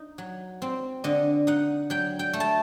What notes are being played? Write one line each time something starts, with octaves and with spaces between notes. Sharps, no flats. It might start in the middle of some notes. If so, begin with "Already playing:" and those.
Already playing: D#4
F#3
C4
D3 D#5
D#4 F#5
F#3 G5
G5
A3
A5